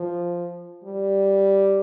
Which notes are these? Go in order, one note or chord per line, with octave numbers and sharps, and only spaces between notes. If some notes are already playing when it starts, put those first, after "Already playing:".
Already playing: F3
G3